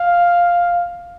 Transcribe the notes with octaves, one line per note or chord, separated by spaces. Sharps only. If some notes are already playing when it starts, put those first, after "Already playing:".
Already playing: F5